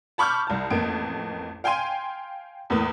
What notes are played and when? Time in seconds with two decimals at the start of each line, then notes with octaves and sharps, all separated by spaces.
0.18 A5 B5 C#6 D6 F6 G6
0.47 C2 A5
0.70 A1 F2 A#3 D7
1.64 F5 G5 G#5 C6 D#7
2.70 E2 A2 A#3 B3 B4 D#6